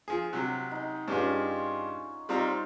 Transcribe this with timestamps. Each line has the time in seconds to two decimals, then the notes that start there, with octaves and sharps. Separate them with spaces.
0.08 F3 G#4
0.33 C3 F#3 F#5
0.71 D#4 G#4
1.08 G2 C#4 F4 G4 G#4
2.29 G3 C4 D#4 F4 A#5